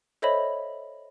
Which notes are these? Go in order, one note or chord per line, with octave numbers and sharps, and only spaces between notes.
A4 C5 C#5 D#5 E5 B5